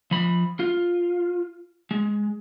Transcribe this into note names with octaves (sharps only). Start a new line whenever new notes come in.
F3 B5
F4
G#3